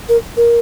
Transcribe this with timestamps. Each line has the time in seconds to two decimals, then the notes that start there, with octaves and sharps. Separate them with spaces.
0.09 A#4
0.37 A#4